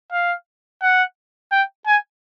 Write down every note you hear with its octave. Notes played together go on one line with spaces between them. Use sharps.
F5
F#5
G5
G#5